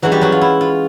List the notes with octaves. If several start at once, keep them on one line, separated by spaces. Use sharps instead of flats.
E3 F#3 G#3 C#4 F#4
G3 G4
F#3 F#4
F4
E4
F4